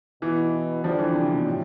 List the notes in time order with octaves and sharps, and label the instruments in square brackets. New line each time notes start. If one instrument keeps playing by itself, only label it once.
[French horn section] B2 B3 E4 [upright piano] E3
[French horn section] D3 G3 D4 [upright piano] F3
[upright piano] E3
C3
B2
A2